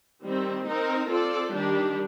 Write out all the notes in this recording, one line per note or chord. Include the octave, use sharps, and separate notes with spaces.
D#3 G3 C4
C4 D#4 A#4
C4 F4 A4 D5
D#3 G3 D4 G4